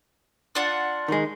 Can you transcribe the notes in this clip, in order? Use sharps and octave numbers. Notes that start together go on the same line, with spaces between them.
D4 F4 F#5
D#3 G#3